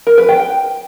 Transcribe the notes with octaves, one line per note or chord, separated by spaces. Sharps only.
A#4
B4
G5
G5